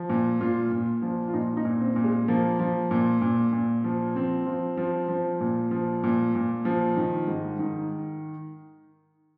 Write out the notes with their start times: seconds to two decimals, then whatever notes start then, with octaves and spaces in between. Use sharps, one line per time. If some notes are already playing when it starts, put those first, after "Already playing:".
Already playing: F3
0.09 A#2
0.41 A#2 F4
0.72 A#2
1.02 F3
1.28 F4
1.33 A#2 D#4
1.57 D#4
1.65 A#2
1.81 C4
1.96 A#2
2.04 G#3
2.28 F3 A#3
2.59 F3
2.91 A#2
3.21 A#2
3.52 A#2
3.84 F3
4.16 F3 C4
4.46 F3
4.77 F3
5.08 F3
5.40 A#2
5.71 F3
6.03 A#2
6.35 A#2
6.65 F3
6.97 D#3
7.27 G#2
7.59 D#3